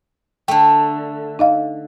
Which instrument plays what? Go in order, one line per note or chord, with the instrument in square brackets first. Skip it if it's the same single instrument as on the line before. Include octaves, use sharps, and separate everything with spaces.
[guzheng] D3 A3 [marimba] G5
[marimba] D#4 D#5 F5